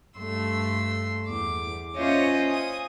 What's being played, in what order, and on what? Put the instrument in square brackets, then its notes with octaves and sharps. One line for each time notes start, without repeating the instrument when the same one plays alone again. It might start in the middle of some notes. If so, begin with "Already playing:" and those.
[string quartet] G2 A3 C6 E6
E2 D6
C#4 F4 C5 C#5 D#5 E5
G#5 D#6